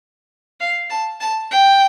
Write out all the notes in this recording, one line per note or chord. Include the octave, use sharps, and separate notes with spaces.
F5
A5
A5
G5